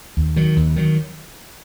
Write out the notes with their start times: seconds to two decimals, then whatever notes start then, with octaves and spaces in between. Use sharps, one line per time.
0.17 D#2
0.36 D#3 F#3
0.56 D#2
0.76 D#3 F#3